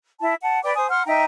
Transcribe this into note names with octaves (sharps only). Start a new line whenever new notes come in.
E4 A5
F#5 A5
B4 D5 G5 D6
C5 G#5 D#6
F#5 C6 F6
D#4 E5 G5 A#5